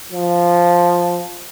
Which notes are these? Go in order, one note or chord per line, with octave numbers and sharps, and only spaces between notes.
F3